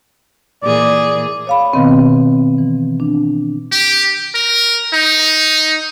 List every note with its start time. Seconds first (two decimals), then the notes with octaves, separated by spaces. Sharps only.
0.63 A#2 E3 G#4 D5
1.47 C#5 F5 B5
1.73 B2 D#3 B3 C4
2.58 E3
3.00 D4
3.72 G4
4.35 A#4
4.94 D#4